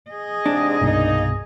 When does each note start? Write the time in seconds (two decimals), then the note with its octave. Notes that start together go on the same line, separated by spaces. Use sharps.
0.10 G#4 D#5
0.46 G#2 C3 D4
0.81 C2 G2 B2 A#3 D#4